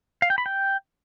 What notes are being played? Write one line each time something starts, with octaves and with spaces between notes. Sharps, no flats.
F5
G5
B5
G5